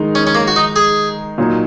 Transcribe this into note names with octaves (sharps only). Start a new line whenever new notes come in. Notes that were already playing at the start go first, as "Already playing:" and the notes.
Already playing: D#3 G#3 D#4
C#4
C#4
A#3
F#4
D#4
G#4
A#2 F#3 D#4